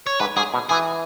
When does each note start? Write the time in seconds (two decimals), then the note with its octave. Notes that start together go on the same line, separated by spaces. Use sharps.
0.07 C#5
0.20 G#2 B4
0.37 G#2 G#4
0.54 B2
0.70 E3 G#4